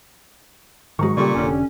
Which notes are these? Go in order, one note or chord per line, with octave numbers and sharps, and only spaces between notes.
G#2 D#3 F#3 G#3 A#5 C#6
A#2 C#3 G3 G4 A4 D5 C#6
F1 D3 C#4